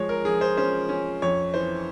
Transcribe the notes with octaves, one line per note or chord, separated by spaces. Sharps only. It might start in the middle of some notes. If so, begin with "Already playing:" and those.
Already playing: F3 G#3 C#5
A#4
F3 G#4
C5
C#4 C5
C#4
F2 C#5
E3 C5